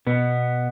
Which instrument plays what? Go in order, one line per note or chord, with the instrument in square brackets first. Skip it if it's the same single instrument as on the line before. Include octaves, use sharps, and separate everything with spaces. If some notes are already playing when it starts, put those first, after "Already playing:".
[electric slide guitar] B2 B3